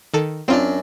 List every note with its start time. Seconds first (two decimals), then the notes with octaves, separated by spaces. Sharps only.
0.14 D#3 A4
0.48 F#2 C4 D4 F4